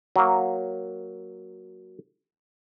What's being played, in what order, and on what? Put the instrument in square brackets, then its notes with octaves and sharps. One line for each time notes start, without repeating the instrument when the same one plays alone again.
[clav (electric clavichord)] F#3 A#3